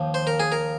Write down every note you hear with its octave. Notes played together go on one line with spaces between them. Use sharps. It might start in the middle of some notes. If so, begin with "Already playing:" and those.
Already playing: D#2 F3
C5
A#4
G#4
A#4